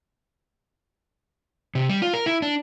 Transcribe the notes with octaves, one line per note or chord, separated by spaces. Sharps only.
C3
G3
F4
A#4
E4
D4